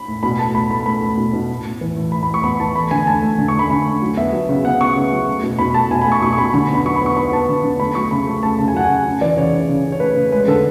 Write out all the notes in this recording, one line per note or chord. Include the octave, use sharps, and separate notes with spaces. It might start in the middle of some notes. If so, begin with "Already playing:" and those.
Already playing: B5
A2
B2 B5
A3 A5
A3 B5
A3 B5
A3 B5
A3
B2
B2
A2
A2
E3
A2
A2 B5
B5
A2
C#6
B3 B5
E3 A5
A3 B5
D3 G#5
A3 A5
A3
D3
C#6
A3
B5
D3 B5
A3
F#3
B3 E5
F#3
C#3
B3 F#5
B3 C#6
C#3
F#3
A3
B2
B2 B5
A3 A5
B2 G#5
B5
A3
C#6
B2 C#6
C#6
B2 B5
D3 B5
B3 B5
F#3 C#6
B5
B3 C#6
B3 B5
B3 A5
D3
D3
A3 B5
F#3 C#6
C#3 B5
A3
A3 A5
C#3 A5
G#5
F#3 F#5
G#5
C#3
C#3
E3 D5
C#3 C#5
C#3
C#3
C#3
C#5
A3 B4
C#3
G#3 B4
D3 A4